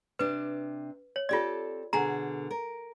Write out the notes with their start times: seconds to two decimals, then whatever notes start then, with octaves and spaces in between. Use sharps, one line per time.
0.19 C3 D4 B4
1.16 C#5
1.29 C4 F4 G4 A4 D5
1.93 B2 D3 G#4 G#5 A#5
2.51 A#4